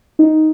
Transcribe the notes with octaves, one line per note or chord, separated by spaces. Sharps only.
D#4